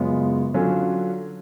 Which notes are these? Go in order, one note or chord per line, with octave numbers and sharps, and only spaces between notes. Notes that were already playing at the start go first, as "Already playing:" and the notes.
Already playing: F#2 C#3 G#3 B3 F4
D3 F#3 C#4 F4